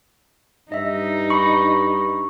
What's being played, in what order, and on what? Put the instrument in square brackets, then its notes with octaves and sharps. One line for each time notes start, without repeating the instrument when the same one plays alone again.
[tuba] G2 [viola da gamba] D#4 [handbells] D#5 E5
[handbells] B5 [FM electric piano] C#6